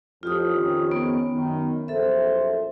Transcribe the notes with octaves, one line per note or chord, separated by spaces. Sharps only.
A1 F2 F3 F4 G4 D#6
F2 D#3 C#4
B3
F#2 D#3
A#1 F#2 A4 C5 E5